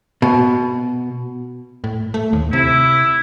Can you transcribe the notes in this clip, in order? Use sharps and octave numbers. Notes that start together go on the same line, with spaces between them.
B2
A2
A3
D#2
C3 E4